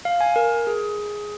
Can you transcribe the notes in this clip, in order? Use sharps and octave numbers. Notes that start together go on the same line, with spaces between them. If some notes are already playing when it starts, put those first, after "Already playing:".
F5
G#5
A#4
G#4